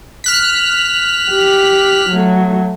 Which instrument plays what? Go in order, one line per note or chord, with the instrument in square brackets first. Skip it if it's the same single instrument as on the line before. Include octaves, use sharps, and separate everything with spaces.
[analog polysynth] F6 F#6 B6
[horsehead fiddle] G4
F#3 A3